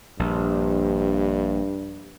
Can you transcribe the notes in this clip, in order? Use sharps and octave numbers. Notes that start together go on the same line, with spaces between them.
A#1 G2